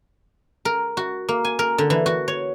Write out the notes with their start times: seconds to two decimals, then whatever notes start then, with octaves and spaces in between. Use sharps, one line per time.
0.65 A#4
0.97 F#4
1.29 A#3
1.45 G#5
1.59 A#4
1.78 D3
1.90 E3
2.06 F#4
2.28 C#5